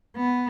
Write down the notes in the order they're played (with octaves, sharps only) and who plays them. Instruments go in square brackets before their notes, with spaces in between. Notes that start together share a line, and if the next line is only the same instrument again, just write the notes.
[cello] B3